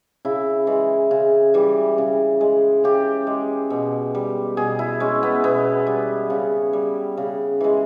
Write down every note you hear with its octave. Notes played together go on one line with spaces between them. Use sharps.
C#3 E4
E3 G#3
C#3
E3 G3
C#3
G#3
C#3 G4
G#3
B2
G3
B2 G#4
E4
G#3 C#4
B3
B2 B3
G3
C#3
G3
C#3
E3 G#3